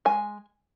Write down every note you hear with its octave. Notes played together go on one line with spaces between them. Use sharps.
G#3 G#5